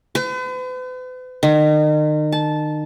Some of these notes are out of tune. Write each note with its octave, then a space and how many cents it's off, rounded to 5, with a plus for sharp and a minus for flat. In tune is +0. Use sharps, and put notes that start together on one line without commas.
B4 +45
D#3 -35
A5 -15